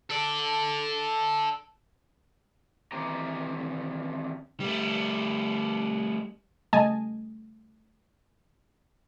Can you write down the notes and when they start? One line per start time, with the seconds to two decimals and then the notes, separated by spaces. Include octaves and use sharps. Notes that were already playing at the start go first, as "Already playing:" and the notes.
0.10 A4 D5
2.92 D#3 E3 C4 G4 G5 A#5
4.60 G3 A3
6.73 C#3 G3 A3 D#5 G#5 A5